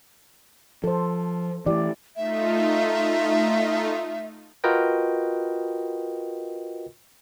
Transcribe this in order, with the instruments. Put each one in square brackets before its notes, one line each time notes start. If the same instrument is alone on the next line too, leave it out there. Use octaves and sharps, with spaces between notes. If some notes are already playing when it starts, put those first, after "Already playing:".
[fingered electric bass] F3 [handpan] A4 C5
[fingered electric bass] E3 G#3 A3 [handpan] E4 G4 D5
[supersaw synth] A3 D#4 F4 [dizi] E5
[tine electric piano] F4 F#4 A#4 B4 D#5 G5